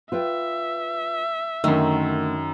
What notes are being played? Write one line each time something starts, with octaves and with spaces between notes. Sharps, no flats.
F4 B4 E5 G5
F#2 D3 D#3 A3 E6